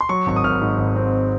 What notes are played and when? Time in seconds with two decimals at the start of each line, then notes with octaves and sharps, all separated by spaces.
0.01 C6
0.09 F#3 C#6
0.26 G#1 C#6
0.36 D#6
0.43 G#1 F6
0.61 G#2
0.78 G#1
0.96 C4